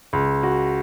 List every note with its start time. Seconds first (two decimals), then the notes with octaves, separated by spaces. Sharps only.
0.13 C#2
0.43 F#4